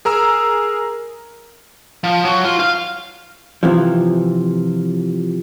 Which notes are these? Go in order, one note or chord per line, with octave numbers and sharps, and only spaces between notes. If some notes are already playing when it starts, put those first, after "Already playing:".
G#4 A#4 A#5 E6
F3
F#3
F4
F5
C3 E3 F3